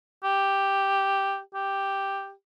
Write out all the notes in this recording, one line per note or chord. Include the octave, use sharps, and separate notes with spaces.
G4
G4